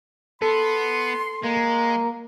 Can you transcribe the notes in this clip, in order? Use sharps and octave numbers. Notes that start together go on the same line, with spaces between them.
B3 A4 C6
G#3 A#3